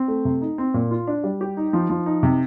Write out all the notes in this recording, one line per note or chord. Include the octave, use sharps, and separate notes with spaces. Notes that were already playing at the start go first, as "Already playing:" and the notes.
Already playing: C4
A3
C3
D#4
C4
A#2
F4
D4
G3
G4
D#4
F3
F3
D#4
C3